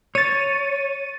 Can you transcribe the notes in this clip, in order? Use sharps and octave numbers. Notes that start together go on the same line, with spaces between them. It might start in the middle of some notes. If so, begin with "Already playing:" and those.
C#5 A6 D#7